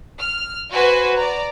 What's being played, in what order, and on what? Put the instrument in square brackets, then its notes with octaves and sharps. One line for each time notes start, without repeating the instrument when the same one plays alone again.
[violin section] F6
F#4 B4 C5 G#5
D5 A#5